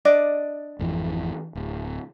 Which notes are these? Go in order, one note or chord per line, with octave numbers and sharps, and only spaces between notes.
D4 D5 D#5
G#1 F2 E3
D1